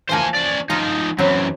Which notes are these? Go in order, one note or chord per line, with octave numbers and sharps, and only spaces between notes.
E3 F3 A#3 C5 G#5
C#4 D5
F3 D#4 F4 A#5
F#2 E3 F#3 C4